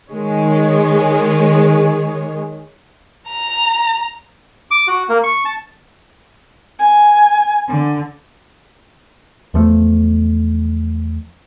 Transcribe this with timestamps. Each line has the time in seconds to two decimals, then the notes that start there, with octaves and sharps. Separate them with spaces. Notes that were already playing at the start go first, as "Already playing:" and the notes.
0.11 D#3 G#3 C#5
3.29 A#5
4.71 D6
4.88 F#4
5.09 A#3
5.24 C#6
5.45 A5
6.79 G#5
7.67 D3
9.54 E2 F3 A3